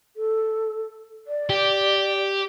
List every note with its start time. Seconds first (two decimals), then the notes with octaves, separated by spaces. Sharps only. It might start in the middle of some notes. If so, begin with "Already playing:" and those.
0.16 A4
1.27 D5
1.50 G4